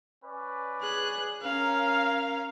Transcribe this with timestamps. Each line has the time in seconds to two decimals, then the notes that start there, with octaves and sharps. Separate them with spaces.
0.22 C#4 B4 D5
0.81 G#4 F#6
1.43 C#4 A#4 F5